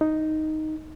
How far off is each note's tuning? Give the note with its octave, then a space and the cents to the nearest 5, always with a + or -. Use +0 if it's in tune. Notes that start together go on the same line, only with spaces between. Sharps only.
D#4 +0